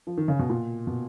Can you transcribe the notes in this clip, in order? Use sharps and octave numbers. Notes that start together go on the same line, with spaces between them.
F3
D#3
C#3
B2
A#2
B2